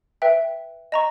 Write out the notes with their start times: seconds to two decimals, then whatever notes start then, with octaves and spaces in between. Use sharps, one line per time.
0.22 B4 E5 G5
0.92 D#5 A#5 C#6